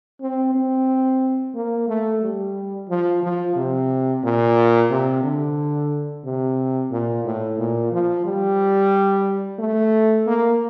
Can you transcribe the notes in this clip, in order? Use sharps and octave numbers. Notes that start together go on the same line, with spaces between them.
C4
C4
A#3
A3
G3
F3
F3
C3
A#2
C3
D3
C3
A#2
A2
A#2
F3
G3
A3
A#3